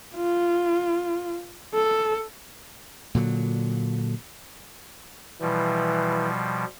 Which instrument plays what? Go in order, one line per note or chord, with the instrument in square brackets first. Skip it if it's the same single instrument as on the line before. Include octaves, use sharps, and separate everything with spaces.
[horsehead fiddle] F4
A4
[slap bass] A#2 D3 F#3
[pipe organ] B2 F3 G3 [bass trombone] E3